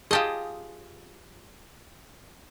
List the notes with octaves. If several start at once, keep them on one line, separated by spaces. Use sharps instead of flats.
F4 G4 G#4 D#5 A5